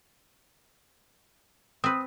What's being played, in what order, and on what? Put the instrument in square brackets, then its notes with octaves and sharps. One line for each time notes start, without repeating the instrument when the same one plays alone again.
[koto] C4 B4 [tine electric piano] D#6